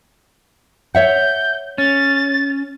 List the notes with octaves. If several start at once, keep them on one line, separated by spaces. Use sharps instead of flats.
C#5 E5 F#5 G6
C#4 A6